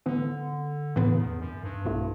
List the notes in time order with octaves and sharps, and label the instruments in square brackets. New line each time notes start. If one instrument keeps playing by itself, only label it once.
[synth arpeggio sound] A2 E3 B3 [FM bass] D3
[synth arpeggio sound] A2 E3 B3 [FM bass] C#3
[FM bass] E2
F#2
G2
[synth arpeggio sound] B1 B2 A3 E4